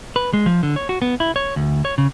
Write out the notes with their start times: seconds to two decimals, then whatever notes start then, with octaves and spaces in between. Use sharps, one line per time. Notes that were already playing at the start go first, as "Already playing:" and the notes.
0.16 B4
0.33 G#3
0.46 F3
0.63 D3
0.76 C#5
0.89 F#4
1.02 B3
1.20 E4
1.36 C#5
1.56 D2
1.85 C#5
1.98 C#3